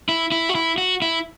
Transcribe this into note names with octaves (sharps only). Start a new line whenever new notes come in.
E4
E4
F#4
E4
F#4
E4